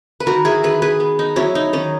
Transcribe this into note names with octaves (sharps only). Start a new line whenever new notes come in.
B4
D#3 F#4 A#4
E4 G#4
D#3 G#4 B4
G#4 B4
B3
D#4
F#3 C#4 E4
D#4
D#3 C#4